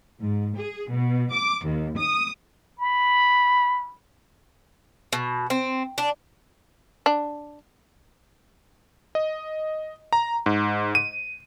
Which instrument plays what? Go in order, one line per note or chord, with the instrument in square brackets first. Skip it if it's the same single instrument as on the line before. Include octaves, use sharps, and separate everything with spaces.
[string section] G#2
G#4
B2
D6
D#2
D#6
[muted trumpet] B5
[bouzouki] B2
C4
D4
[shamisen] D4
[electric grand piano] D#5
A#5
G#2
D#7